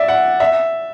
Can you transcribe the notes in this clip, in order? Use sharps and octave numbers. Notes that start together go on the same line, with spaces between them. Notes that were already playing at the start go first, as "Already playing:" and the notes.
Already playing: D5 E5
F#5
E5